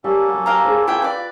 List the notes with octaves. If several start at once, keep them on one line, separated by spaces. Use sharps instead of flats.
G3 A#3 C#4 A4
F#3
G4 F5 A#5
G#4 C5
E4 F4 G#4 G5
B4 D5